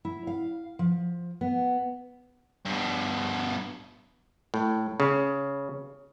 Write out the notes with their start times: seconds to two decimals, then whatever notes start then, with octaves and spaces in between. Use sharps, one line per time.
0.05 E4
0.27 F5
0.79 F3
1.41 B3
2.66 G2 B2
4.54 A2
5.00 C#3